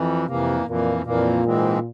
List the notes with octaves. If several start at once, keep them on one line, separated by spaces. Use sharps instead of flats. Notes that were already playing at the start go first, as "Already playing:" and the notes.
Already playing: F2 E3
F2 C3 E3 A#3
F2 A#2 E3 A#3
F2 A#2 E3 A#3
G#2 E3 G#3 C4